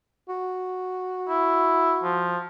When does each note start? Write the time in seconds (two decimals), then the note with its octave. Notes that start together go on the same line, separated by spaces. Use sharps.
0.29 F#4
1.29 E4
2.04 F3